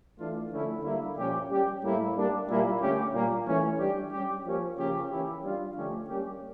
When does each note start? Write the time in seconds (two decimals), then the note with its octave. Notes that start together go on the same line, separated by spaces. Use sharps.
0.18 E3 A3 D4 F4
0.51 D3 F3 A3 C#4 E4
0.83 D3 G3 A#3 E4
1.16 A#2 F3 C#4 G4
1.49 G3 C#4 G4
1.82 A2 G3 A#3 E4
2.15 G3 A#3 D4
2.47 A#2 G3 A#3 E4 G4
2.81 D3 A3 C#4 G4
3.13 A#2 G3 A#3
3.46 E3 A3 C#4
3.79 G3 D4 G4
4.12 G3 C#4 G4
4.44 F3 A#3 C#4 G4
4.77 C#3 F3 A#3 C#4 G4
5.10 E3 A#3 C#4 E4 G4
5.42 G3 D4 F4
5.75 D3 F3 A3 C#4 G4
6.08 G3 A#3 C#4 G4